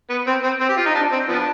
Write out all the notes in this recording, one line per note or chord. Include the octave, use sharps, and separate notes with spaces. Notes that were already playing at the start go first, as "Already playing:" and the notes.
B3
C4
C4
C4
G4
F4
D#4
D4
C4
F3 B3 D4